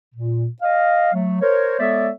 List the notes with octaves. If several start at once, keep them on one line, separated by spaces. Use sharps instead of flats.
A#2
D#5 F5
F#3 A3
A#4 C5 C#5
G#3 B3 A4 C#5 D5 E5